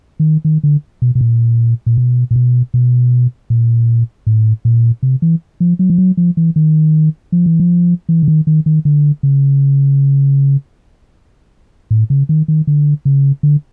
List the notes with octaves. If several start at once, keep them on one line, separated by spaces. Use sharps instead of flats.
D#3
D#3
D3
B2
B2
A#2
A#2
B2
A#2
B2
B2
A#2
A2
A#2
C3
E3
F3
F#3
F3
F#3
F3
E3
D#3
F3
E3
F3
E3
D3
D#3
D#3
D#3
D3
C#3
A2
C#3
D#3
D#3
D3
C#3
D3